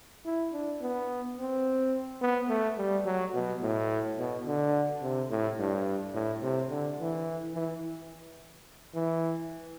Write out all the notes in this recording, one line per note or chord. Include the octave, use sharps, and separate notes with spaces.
E4
D4
B3
C4
B3
A3
G3
F#3
B2
A2
B2
D3
C3
A2
G2
A2
C3
D3
E3
E3
E3